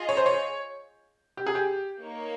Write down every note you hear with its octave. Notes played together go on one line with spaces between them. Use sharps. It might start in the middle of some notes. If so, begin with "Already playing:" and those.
Already playing: F4 G#4 D#5
C#5
C5
C#5
G4
G#4
G4
A#3 D#4 A#4 C#5